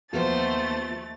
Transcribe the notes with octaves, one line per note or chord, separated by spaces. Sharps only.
D#2 F3 A3 B3 F4 C5 A6